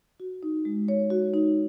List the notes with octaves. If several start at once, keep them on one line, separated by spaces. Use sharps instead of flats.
F#4
D#4
G#3
C#5
F#4
D#4